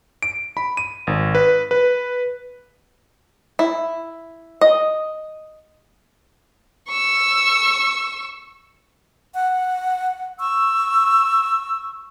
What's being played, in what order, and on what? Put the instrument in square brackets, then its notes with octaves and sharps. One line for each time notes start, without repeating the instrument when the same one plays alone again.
[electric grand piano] D7
B5
D#7
G#1
B4
B4
[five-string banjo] E4
D#5
[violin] C#6 E6
[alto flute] F#5
[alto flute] C#6 [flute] E6